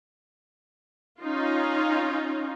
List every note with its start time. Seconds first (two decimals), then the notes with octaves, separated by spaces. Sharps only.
1.20 C#4 D#4 F4